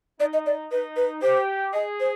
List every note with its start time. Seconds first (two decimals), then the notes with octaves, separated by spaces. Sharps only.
0.20 D#4 D5
0.33 D#5
0.46 D5
0.71 D#4 B4
0.96 B4
1.22 G4 C5
1.73 G#4 D#5
2.00 C5